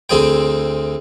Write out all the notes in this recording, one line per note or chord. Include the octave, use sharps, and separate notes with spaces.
D2 C4 G#4 G5